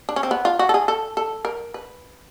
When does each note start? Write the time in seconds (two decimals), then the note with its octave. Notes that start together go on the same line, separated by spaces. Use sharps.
0.09 D4
0.16 C#4
0.23 C4
0.31 B3
0.45 F4
0.59 F#4
0.69 A4
0.74 G#4
0.88 A4
1.17 A4
1.45 A#4
1.74 B4